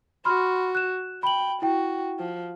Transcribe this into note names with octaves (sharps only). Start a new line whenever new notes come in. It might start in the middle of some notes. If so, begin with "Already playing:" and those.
F#4 B5 C6 F6
F#6 E7
G5 B5 F#7
E4 F#4 G5
F3